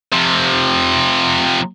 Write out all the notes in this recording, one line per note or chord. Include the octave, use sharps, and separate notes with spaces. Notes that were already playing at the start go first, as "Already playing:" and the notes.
C3 F3